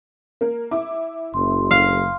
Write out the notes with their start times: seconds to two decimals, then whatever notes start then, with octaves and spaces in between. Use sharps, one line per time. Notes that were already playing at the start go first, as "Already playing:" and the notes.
0.41 A#3 A#4
0.71 E4 D6
1.34 F#1 C6
1.71 F5